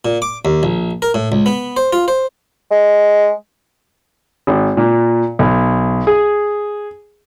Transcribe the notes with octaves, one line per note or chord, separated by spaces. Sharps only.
A#2
D6
D#2
A#1
A#4
A2
C#2
B3
C5
F4
C5
G#3
G#1
A#2
B1
G#4